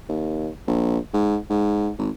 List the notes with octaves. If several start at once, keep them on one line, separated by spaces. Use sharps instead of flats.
D#2
A#1
G#2
G#2
G#1